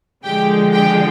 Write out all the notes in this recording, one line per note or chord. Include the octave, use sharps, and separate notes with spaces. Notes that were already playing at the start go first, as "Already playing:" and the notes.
D3 F3 G#3 G4 G5
G4 G5